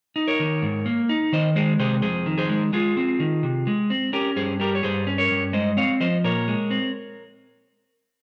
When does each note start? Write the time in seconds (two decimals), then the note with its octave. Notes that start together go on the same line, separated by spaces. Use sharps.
0.16 D#4
0.28 A#4 C#5
0.40 D#3
0.62 G#2
0.86 A#3
1.09 D#4
1.33 D#3 C5 D#5
1.56 G#3 G#4 C5
1.79 C3 G#4 C5
2.02 F2 G#4 C5
2.26 D#3
2.38 G#4 C5
2.49 G#3
2.73 G#3 F4 G#4
2.97 C4
3.20 D#3
3.43 C3
3.67 G#3
3.90 C4
4.13 C#4 G4 A#4
4.36 G2 G#4 C5
4.60 G3 G4 A#4
4.75 C#5
4.83 G2 G#4 C5
5.07 C#4
5.18 A#4 C#5
5.31 G2
5.53 G#3 C5 D#5
5.77 C4 C#5 F5
6.00 F3 C5 D#5
6.24 A#2 A#4 C#5
6.48 G#3
6.70 C4